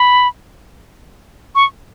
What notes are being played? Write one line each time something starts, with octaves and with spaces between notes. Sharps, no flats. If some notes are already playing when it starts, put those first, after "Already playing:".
Already playing: B5
C#6